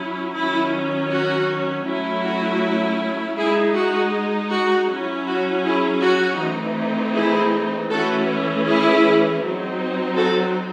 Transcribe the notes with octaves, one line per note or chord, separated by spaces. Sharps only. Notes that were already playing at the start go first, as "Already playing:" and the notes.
Already playing: F#3 C#4 E4
D#3 F#3 C#4 E4
F#4
F#3 A3 C#4 E4
F#4
G#3 D#4 E4 G#4
F#4
F#4
F#3 C#4 E4
F#4
E4 G#4
F#4
E3 A3 C4 D#4
E4 G#4
E3 A3 C#4 E4 F#4 A4
E4 G#4
F#3 C4 D#4
F#4 A4